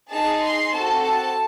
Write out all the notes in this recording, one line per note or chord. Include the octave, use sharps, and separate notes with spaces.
D#4 G#4 A5
C6
C4 F#4 A4 A5
A5